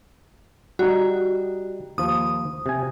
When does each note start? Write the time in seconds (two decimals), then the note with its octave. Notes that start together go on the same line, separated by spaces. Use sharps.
0.79 G3 D#4 F#4
1.98 D#2 F3 D#6
2.66 C3 G#5